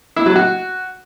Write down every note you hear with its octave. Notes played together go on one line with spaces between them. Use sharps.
E4
F#3
F#4